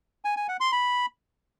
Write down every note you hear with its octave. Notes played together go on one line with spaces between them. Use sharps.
G#5
G#5
F#5
C6
B5